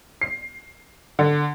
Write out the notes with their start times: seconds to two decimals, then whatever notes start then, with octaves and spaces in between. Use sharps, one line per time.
0.21 C7
1.19 D3